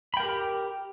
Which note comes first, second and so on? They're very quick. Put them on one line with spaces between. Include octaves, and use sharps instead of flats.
B5 G5 A#4 G4